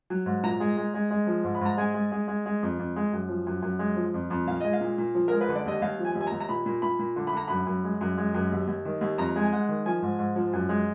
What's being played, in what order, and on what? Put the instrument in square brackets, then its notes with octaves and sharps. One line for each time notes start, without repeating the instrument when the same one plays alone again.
[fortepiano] F#3
G#2
A#2 A#5
G#3
G#3
G#3
G#3
F3
G#2
B5
G#2 A#5
G#3 G#5
G#3
G#3
G#3
G#3
F2
F2
G#3
F#2
F3
F#2
F#2
G#3
F3
F2
F2
A#2 F5
G#3 D#5
F5
A#2
A#2
F3
G#3 A#4
B4
D3
D5
D#2 D#5
D#2 F5
F3
G#5
D#2
G#5
A#5
D#2
A#5
A#2 B5
A#2
A#2 B5
A#2
D3
B5
D3 A#5
F#2 B5
F#2
G#3
F#2
G#3
F#2
D#2
D#2
D#3
D#2
F2 A#5
G#3
G#5
G#3 F#5
D#3
F3 G#5
G#2
G#2
F3
F#2
G#3